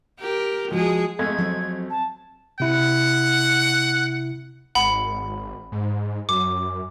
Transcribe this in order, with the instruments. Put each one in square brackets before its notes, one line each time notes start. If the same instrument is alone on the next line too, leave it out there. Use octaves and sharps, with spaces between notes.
[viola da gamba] G4 A#4
[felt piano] F3 F#4 [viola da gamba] G#3 G#4
[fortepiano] F2 G#3 A3 [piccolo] G#6
[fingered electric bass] F3 F#3 C4
[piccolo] A5
[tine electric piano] C3 E4 [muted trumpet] F#5
[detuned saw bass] G#1 [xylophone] F#5 B5
[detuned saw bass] G#2
[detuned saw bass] F#2 [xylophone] D6